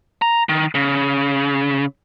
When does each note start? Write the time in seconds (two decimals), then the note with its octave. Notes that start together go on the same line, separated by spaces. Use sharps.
0.22 A#5
0.49 D#3
0.75 C#3